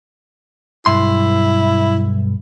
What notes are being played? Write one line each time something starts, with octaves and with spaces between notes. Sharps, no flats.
B1 G2 E4 C6